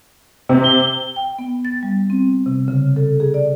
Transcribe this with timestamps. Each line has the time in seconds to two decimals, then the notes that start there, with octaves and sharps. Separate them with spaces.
0.49 C3 C4
0.64 G7
1.16 G5
1.39 B3
1.65 A6
1.83 G3
2.10 C4
2.46 C3
2.68 C#3
2.96 A4
3.20 G#4
3.34 D5